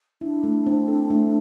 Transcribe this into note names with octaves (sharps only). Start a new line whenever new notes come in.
D4 E4
A3
C4
A4
A3